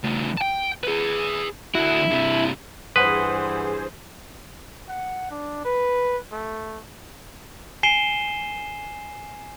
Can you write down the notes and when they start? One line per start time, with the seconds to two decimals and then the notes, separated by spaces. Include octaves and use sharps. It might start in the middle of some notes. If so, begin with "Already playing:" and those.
0.04 C#3 A3
0.37 G5 A5
0.84 G#4 B4
1.75 D3 E4 F#4
2.11 G2 C3
2.96 G2 E3 G#4 B4 C5 F#5 C6 D#6
4.88 F#5
5.31 D4
5.65 B4
6.31 A3
7.83 G#5 C7 D#7 E7 G7